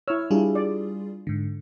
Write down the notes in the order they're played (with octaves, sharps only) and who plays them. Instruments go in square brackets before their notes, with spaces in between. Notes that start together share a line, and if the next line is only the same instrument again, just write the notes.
[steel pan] E4 C#5 [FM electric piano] E6 F6
[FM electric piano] G3 F4 G#4 [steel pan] D4 E4
[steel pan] D5
[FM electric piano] G#2 D3